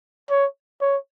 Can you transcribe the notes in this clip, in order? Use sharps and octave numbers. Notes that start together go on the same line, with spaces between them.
C#5
C#5